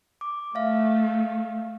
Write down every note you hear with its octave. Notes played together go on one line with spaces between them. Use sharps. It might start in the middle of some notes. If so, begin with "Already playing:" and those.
D6
A3 E5 F5